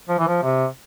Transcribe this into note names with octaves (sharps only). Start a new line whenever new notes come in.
F3
E3
F3
C3